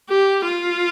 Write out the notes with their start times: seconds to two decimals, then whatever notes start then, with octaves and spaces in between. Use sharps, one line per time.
0.09 G4
0.44 F4